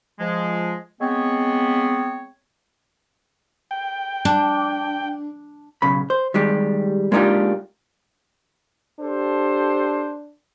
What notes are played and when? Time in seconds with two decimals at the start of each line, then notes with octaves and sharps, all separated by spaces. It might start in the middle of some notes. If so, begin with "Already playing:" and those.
0.20 F3 G#3
1.00 G#3 B3 C4 C#5
3.71 G5
4.25 D4
5.82 B1 C#3 B5
6.10 C5
6.34 D#3 G3 G#3 G4
7.12 G#3 A#3 D4 D#4 F4 G4
9.00 D4 G4 A4 C5